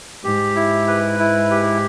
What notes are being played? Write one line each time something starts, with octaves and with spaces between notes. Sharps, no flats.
G#2 G4
E4
B4
E4
G4